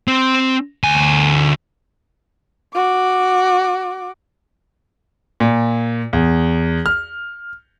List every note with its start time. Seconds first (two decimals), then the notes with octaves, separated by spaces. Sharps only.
0.08 C4
0.84 D2 G#5
2.74 F#4 D6
5.40 A#2
6.13 E2
6.86 F6